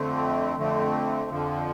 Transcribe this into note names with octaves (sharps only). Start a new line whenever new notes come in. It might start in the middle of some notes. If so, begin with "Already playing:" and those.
Already playing: F2 D3 A3 C4
F2 D3 A3 C4
F2 D3 F3